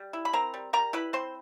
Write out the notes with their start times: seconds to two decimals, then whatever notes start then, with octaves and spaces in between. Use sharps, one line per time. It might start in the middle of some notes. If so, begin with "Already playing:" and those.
Already playing: G3
0.13 E4
0.25 B5
0.33 C4 A#4 A#5
0.54 G3
0.73 G3 A#4 A#5
0.93 E4 B4 B5
1.13 C4 C5 C6